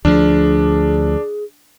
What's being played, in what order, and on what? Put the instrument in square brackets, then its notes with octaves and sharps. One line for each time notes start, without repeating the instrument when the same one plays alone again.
[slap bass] D2 F3 [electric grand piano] D4 [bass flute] G#4